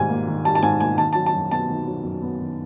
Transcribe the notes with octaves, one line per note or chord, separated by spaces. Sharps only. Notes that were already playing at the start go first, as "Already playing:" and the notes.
Already playing: G#2 D#3 G3 G#5
A#3
D#3
G3 A5
A5
G#2 G#5
A#3 G#5
D#3 A5
A5
F#3
A5
F#2
B3 A5
D#3
F#3
F#2
B3
D#3